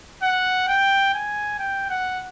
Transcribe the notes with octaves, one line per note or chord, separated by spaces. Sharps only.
F#5
G5
G#5
G5
F#5